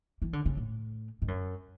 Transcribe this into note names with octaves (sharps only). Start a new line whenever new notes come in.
E3
D3
C#3
A2
G#2
F#2